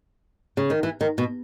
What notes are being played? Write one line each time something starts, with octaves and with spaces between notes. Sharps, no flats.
C#3
D#3
E3
D#3
B2